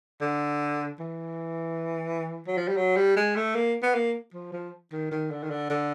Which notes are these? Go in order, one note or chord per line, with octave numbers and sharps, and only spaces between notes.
D3
E3
F#3
F3
G3
F#3
G3
G#3
A3
A#3
B3
A#3
F3
F3
D#3
D#3
D3
D#3
D3
D3